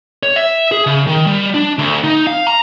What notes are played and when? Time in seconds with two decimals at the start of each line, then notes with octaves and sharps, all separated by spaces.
0.23 C#5
0.36 E5
0.72 G#4
0.86 C#3
1.07 D#3
1.27 G3
1.54 D4
1.78 D2
2.04 D#4
2.27 F5
2.47 A#5